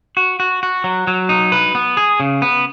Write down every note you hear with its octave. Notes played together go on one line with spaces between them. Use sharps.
F#4
F#4
F#4
F#3
F#3
D#4
B4
B3
G#4
C#3
B3